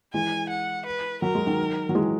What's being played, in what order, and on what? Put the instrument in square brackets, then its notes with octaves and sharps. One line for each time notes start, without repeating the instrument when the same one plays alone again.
[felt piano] E3 G#3 [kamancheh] G#5
[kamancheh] F#5
B4
[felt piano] F#3 [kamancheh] A#4
[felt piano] G#3
D#3 F#3
F#3
E3 G#3